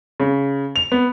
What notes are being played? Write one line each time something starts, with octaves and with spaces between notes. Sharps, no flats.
C#3
F7
B3